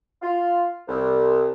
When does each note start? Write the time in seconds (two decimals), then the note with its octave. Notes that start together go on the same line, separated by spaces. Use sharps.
0.22 F4
0.87 C2